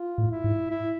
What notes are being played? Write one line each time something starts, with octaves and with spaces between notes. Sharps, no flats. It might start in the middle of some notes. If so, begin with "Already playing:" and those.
Already playing: F4
A2
E4
G#2
E4